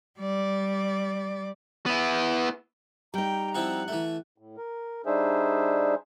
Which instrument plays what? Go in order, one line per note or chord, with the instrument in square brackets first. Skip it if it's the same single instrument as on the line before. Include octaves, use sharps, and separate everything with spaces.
[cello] G3 D5
[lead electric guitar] B3 E4
[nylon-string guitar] G3 D#4 [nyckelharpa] G5 [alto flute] A#5
[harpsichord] F3 C4 E4 [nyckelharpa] F#5
[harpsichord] E3 A3
[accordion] A2
A#4
G3 D4 D#4 G#4 C5 E5